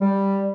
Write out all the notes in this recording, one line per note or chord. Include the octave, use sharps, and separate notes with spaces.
G3